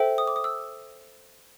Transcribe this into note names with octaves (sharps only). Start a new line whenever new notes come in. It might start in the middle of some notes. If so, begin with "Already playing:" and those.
Already playing: A4 C5 E5 G5
D#6
D6
D#6
E6